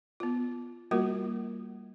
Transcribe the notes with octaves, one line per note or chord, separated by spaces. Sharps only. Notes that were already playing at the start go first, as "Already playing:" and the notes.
B3 F4
G3 A#3 F4 F#4 A#4